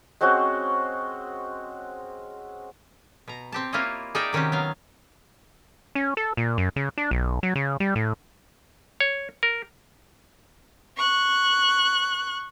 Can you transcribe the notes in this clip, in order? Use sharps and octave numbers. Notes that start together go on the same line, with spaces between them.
G#3 C4 C#4 F#4
B2 A#5
C4 G4 A5
A#3 E4 F4 C5 C#5 D#5
D#4 G#4 A#4 D5 E5 G5
C3 D#3 C#4 F#4 G4
F#3 B3 F5
C#4
A4
A#2
F#2
C#3
D4
B1
F#3
C#3
G3
A2
C#5
A#4
C#6 F#6